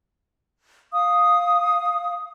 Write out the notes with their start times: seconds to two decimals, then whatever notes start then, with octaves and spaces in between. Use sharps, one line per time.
0.93 F5 D#6